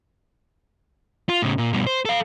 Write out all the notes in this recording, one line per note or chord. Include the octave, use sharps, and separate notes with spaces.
F4
A2 C#3
A#2
G2 B2
C5
A4 F5